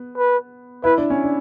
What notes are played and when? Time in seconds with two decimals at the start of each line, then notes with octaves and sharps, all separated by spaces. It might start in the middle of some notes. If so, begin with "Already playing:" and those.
Already playing: B3
0.17 B4
0.84 E4 B4
0.98 D4
1.10 C#4
1.24 D4